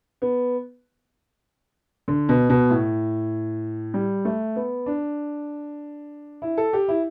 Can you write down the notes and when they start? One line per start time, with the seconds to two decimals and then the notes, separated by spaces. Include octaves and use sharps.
0.22 B3
2.08 D3
2.29 B2
2.50 B2
2.70 A2
3.94 G3
4.25 A3
4.56 B3
4.86 D4
6.42 E4
6.57 A4
6.73 G4
6.88 E4